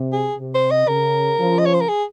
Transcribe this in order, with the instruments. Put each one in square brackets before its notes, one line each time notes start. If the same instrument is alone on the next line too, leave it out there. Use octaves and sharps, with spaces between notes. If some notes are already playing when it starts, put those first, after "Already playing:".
Already playing: [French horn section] C3
[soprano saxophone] G#4
[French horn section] C3
[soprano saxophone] C5
D#5
[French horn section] C#3 [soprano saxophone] A#4
[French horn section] C#3 F3
[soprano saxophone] D#5
C#5
C5
A#4
G#4